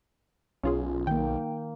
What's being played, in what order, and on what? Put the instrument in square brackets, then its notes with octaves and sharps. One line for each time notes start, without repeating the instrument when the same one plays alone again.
[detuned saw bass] B1 [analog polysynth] C#4 F4 G#4
[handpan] D#3 A#3 [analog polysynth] G5